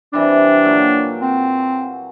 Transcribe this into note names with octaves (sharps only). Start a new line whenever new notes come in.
C3 E3 G3 D4
A#2 F#3 G5
C4